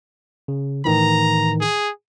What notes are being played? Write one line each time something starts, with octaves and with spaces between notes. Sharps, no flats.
C#3
A2 D#3 E3 A#5
G#4